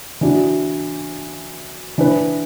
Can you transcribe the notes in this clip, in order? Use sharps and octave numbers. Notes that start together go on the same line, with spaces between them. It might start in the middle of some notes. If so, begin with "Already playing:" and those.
E3 D4 F#4
E3 D4 B4